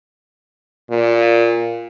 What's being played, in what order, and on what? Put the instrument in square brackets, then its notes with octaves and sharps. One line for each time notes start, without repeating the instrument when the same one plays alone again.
[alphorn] A#2